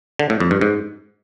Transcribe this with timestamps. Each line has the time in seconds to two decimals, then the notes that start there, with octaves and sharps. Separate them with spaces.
0.19 D3
0.30 A2
0.40 F2
0.51 G2
0.61 G#2